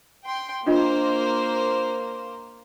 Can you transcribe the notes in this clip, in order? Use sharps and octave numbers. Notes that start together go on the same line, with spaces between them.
G5 C6
A#3 D4 F4 C5 D#5